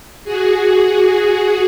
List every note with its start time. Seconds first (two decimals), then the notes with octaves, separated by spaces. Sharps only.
0.24 F#4 G#4